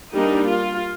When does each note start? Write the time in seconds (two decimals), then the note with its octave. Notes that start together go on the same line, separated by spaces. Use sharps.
0.15 G3 A#3 D4 D#4
0.48 F4